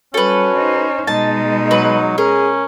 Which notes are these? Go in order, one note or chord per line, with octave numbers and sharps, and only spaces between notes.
F#3 G3 C#4 A4 B4
D#4 C5
B2 G#3 D#4 A5
F#3 B4
C#4 G#4 A#4